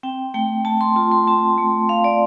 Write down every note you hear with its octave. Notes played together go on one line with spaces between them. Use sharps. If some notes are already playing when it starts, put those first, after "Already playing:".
C4 G5
A3 G5
A3 A5
C6
F4 A5
C6
C4 A5
A3
A3 F5
D5